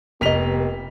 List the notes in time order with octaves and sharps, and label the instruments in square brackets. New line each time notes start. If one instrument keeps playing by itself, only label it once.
[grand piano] F1 B6 F7 [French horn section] A#3 B3 G4 [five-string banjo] A#4 D#5